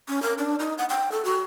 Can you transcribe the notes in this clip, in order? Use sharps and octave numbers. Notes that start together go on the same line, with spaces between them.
C#4
A#4
D4
D#4
F#5
G5
A4
F#4